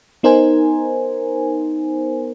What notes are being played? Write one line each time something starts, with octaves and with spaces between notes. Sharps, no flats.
B3 D#4 A#4 C5 G#5